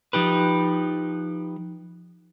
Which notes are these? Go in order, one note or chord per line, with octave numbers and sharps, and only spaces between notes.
F3 D#4 G4 B4